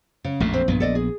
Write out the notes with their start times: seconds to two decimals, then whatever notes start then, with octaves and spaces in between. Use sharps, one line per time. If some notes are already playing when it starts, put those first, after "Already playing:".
0.24 C#3
0.40 A#1 F2 A2 A3
0.53 C4
0.68 A#1 G2 B3
0.80 A4 D5 D#5
0.95 G#4